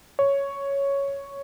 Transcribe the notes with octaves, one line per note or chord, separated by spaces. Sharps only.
C#5